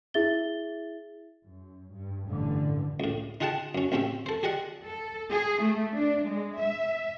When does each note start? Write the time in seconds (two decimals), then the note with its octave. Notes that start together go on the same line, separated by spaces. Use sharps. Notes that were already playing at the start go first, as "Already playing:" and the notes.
0.14 E4 G#4 E5 A6 G7
1.47 F#2
1.93 G2
2.28 A1 G2 D3 E3
3.00 C#2 A2
3.41 D#4 F4 G#4 F#5 G5 A5
3.75 F#2 C#4
3.92 A1 C4 C#4 G4 E5
4.26 A4 C5
4.43 G4 G#4 D5 D#5 F#5
4.88 A4
5.30 G#4
5.61 A3
5.95 D4
6.27 G#3
6.59 E5